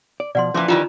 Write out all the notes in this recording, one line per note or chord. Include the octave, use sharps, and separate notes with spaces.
D5
B2 F3 D5 F#5 C6
A#2 E3 F3 C#4 E4 C6 D6
D#3 E3 G3 F4 A#5 B5